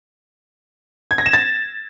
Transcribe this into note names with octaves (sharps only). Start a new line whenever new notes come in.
G#6
A#6
E7
A6